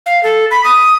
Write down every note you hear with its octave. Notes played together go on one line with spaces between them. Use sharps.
F5
A4
B5
D#6